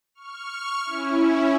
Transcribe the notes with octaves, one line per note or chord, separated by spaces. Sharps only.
C#6 F6
C#4 E4